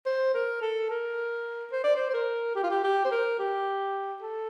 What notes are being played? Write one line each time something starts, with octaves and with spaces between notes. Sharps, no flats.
C5
A#4
A4
A#4
C5
D5
C5
C5
A#4
G4
F4
G4
G4
C5
A#4
G4
A4